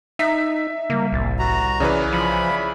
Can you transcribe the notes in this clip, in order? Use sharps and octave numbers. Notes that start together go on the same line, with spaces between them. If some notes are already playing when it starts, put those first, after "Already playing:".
D#4 E5 B6
C#3 G3 A#3
G1 C2 A2 A6
F#4 A#5
B1 C#3 E3 B4 C#5 D5
F3 B5